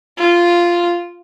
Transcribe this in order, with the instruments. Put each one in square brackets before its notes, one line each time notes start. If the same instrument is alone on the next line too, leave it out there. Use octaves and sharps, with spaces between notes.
[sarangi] F4